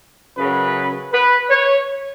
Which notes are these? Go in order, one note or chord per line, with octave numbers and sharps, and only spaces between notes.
F#2 C#3 F#3 B4
B4
C#5